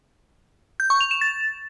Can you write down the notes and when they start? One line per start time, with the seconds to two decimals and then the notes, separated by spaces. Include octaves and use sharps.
0.80 G6
0.90 C#6
1.01 F7
1.11 E7
1.21 A6